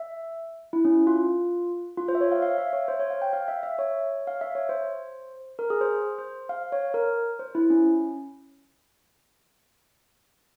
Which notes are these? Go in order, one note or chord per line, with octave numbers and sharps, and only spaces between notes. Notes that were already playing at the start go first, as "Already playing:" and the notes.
Already playing: E5
E4
C#4
F4
F4
C5
E5
C#5
F5
F5
E5
C#5
C5
C#5
F5
G5
F5
E5
E5
C#5
F5
E5
C#5
C5
A#4
G#4
C5
C5
F5
C#5
A#4
C5
E4
C#4